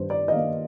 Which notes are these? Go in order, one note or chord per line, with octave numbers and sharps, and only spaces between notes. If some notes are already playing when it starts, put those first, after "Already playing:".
Already playing: G2 D#3 C5
D5
D#5
D#3 A#3 F5